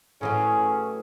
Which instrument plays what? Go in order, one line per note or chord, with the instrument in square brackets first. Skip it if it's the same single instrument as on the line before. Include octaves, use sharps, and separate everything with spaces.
[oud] A2 E3 F#3 [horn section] C#4 G#4